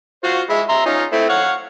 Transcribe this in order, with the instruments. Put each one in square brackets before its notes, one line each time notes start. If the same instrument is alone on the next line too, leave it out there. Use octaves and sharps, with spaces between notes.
[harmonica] F4 F#4 C5
G#3 E5 B5
E5 A#5 C6
C#4 D#4 F4
A3 C4 E4
C#5 F5 F#5